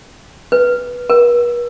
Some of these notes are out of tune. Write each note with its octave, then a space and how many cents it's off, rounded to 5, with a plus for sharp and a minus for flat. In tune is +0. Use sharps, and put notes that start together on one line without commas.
B4 -10
B4 -45